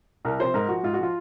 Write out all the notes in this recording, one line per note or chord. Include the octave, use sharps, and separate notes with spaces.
C2 A#4
C3 F3 C5
G#2 A#4
F3 F#4
G#2 F4
F#4
F3 F4